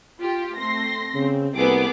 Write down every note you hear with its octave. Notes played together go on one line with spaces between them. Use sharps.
F4 G4
A3 C4 C6 A#6
C#3 C4
C2 A#3 B3 G#4 A4 D6